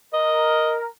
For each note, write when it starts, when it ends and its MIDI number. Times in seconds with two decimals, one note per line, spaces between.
0.13 0.87 70
0.13 0.75 75